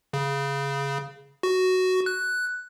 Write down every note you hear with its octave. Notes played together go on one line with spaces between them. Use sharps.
C#3
F#4
F#6